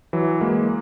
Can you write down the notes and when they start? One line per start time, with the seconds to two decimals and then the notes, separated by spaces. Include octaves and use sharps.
0.13 E3 F#3
0.41 G#3 A#3